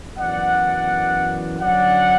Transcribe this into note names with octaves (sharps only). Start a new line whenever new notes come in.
F#2 E3 B3 D5 F#5
D3 F#3 C#4 D5 F#5